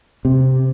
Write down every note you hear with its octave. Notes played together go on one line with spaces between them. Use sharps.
C3